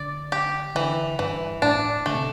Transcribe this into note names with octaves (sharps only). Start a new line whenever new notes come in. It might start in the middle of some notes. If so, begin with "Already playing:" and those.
Already playing: D3 D5
G4
D3 E3
G2 E3
A2 D4
D3 A3
C3